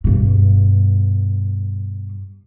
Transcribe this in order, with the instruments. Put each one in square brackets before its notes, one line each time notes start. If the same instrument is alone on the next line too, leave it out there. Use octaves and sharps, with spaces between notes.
[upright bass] G2 B2